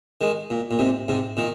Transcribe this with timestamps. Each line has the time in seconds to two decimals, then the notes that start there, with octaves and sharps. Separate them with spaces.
0.21 D#3 G#3
0.50 A#2
0.71 A#2
0.79 G#2 C3
1.08 G#2 C3
1.37 A#2 D#3